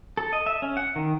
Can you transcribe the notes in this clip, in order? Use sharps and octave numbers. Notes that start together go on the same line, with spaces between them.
A4
D#5
E5
C#4
F#5
D#3